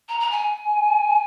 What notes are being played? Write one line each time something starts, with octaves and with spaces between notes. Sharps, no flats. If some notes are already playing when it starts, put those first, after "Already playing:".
A#5
A#5
G#5